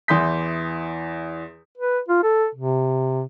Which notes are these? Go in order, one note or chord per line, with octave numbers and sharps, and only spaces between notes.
E2 E3 C6 D#6 G6 B6
B4
F4
A4
C3